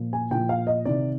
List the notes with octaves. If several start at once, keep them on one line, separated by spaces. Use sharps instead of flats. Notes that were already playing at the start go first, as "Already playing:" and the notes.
Already playing: A#2 F3
G#5
A#2 F3 G5
F5
D#5
C3 D#3 D5